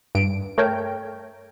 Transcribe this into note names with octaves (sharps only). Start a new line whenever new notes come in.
G2 D7
A3 A#4 C#5 G5